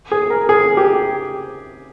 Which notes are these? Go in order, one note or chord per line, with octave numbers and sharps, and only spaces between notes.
G#4
A#4
G#4
G4